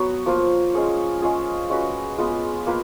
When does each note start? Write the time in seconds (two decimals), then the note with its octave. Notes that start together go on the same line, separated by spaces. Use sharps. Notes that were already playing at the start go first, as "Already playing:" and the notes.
Already playing: F#3 B3 F#4 C#5
0.26 F3 A#3 F4
0.73 G#3 C#4 G#4 C#5
1.22 G#3 C#4 F4 G#4
1.70 G#3 C#4 F#4 B4
2.18 G#3 B3 F4
2.66 A#3 F4 B4